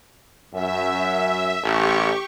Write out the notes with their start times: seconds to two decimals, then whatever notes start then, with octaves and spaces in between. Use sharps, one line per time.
0.53 F#2 E5
1.63 A1 G4 C#6